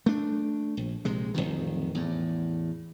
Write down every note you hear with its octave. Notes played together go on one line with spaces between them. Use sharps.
A3 D4
A#1
A#1 C3 G#3
D1 C2 F2 D#3
E2 A2